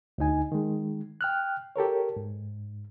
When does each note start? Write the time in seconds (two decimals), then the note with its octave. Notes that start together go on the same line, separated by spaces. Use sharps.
0.18 D2 D3 D#4 G#5
0.52 D#3 G#3
1.21 G5 F6 F#6
1.76 G4 A4 A#4 C#5
2.17 G#2